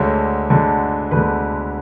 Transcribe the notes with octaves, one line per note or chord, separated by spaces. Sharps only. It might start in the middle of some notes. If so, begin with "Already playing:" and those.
Already playing: D2 D3 G#3 C#5
D2 D3 G#3
D2 D3 G#3 B4